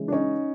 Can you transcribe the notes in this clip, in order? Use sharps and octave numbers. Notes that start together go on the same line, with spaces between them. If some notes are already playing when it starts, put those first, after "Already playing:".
Already playing: C#3 E3 G#3
D4
C#4 D#4